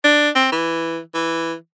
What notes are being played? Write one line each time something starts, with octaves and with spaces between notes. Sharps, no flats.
D4
C4
E3
E3